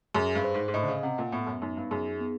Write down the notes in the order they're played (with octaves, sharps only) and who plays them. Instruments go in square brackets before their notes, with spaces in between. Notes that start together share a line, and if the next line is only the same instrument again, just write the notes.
[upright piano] F#2 [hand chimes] G#4
[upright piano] G2
[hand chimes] C5
[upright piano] G#2
G#2
[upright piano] A2 [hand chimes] D#5
[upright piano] D3
C#3
[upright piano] C3 [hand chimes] F#5
[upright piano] A#2
[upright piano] A2 [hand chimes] B3
[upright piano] F#2
[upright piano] F#2 [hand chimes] D#4
[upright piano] G2
[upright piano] F#2 [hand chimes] G#4
[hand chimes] B3